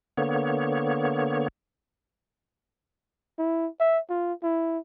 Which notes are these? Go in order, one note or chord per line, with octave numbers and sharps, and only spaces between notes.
D3 A#3 B3 C#5
E4
E5
F4
E4